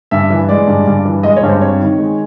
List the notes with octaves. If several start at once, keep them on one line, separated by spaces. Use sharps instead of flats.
G2 E5
E3
G#3 D5
G2
G2
E3
G#3 D#5
C#5
G2
C5
C4 C#5
D#3
G#3